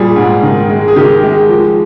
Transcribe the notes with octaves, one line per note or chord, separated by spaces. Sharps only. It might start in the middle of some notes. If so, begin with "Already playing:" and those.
Already playing: A#2 G3 G#4
G#2
D#3
G#3
G#4
D#3 G4
G#3
F3